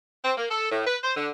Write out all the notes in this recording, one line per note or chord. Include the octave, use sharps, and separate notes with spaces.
C4
A#3
A4
A2
B4
C5
D3